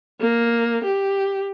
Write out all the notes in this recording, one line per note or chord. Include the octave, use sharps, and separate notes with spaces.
A#3
G4